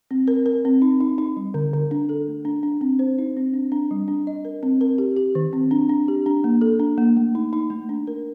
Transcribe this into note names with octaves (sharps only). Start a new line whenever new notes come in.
C4
A#4
A#4
C4
D#4
D#4
D#4
G3
D3
D3
D4
A4
A3
D4
D4
C4
C5
D#4
C4
D4
D4
G3
D4
D#5
A#4
C4
A#4
G4
G4
D#3
C4
D4
D4
G4
D4
A#3
A4
D4
A#3
A3
D#4
D#4
A3
D4
A#4